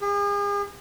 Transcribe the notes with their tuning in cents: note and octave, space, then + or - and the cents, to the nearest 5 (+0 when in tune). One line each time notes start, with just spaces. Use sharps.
G#4 -40